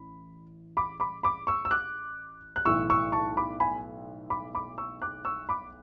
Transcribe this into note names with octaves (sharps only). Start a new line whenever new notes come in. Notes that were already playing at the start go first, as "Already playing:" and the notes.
Already playing: A1 B5
B5 D6
B5 D6
B5 D6
C#6 E6
E6
D6 F#6
F#6
B1 A2 E3 C#6 E6
C#6 E6
A5 C#6
B5 D6
G#5 B5
B5 D6
B5 D6
C#6 E6
D6 F#6
C#6 E6
B5 D6